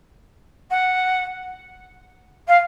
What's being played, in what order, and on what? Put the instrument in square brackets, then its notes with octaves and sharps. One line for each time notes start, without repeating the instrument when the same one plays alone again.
[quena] F#5
F5